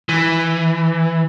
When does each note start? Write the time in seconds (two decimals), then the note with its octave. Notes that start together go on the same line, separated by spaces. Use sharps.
0.09 E3